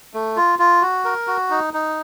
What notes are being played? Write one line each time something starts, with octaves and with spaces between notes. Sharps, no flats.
A3
F4
F4
F#4
A#4
F#4
D#4
D#4